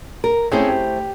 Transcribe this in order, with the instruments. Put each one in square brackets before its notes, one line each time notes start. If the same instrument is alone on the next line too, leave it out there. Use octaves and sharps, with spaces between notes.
[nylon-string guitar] A#4
[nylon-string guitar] A3 E4 C5 [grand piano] C4 C#4 G#4
[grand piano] G4